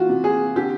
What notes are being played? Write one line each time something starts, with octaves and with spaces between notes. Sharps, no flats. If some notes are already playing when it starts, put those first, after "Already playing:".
Already playing: E3 F4 F#4
C3
G#4
D3 G4